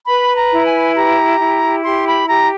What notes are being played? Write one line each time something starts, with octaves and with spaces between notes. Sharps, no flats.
B4 B5
A#5
E4
G#5
G4 A#5
E4
G4 C6
B5
G4 A#5